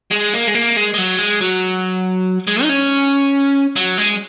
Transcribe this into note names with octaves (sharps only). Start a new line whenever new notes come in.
G#3
A#3
G#3
A#3
G#3
G#3
F#3
G#3
F#3
G#3
D#4
C#4
F#3
G#3